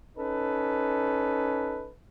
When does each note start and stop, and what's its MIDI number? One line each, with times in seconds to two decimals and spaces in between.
0.17 1.90 61
0.17 1.90 63
0.17 1.90 69
0.17 1.90 71